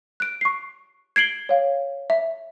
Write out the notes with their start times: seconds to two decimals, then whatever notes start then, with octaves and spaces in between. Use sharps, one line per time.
0.20 F#6 D7
0.41 C#6 C7
1.16 G#6 C7 D7 F#7 G7
1.49 C#5 F5
2.10 E5